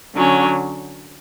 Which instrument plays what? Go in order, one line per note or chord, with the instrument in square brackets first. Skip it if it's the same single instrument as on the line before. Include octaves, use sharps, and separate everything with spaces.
[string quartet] D3 F#3 C#4